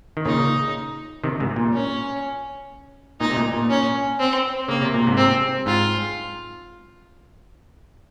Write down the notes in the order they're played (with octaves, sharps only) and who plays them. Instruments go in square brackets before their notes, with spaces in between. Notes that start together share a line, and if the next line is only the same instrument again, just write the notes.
[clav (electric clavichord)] D#3
[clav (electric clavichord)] A#2 C#3 [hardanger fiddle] D#4
[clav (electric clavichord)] C3 D#3
G#2 C3
A#2
[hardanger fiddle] C#4
[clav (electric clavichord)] A#2 [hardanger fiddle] D#4
[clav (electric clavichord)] C3
A#2
A#2
[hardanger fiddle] C#4
C4
[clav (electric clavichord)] C#3 [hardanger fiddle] A#3
[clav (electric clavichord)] C3
A#2
G#2 C3
[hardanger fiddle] C4
[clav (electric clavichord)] G#2 [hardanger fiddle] F4